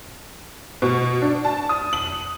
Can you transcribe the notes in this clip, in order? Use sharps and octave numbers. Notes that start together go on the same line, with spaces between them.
B2
D4
A5
D#6
F#7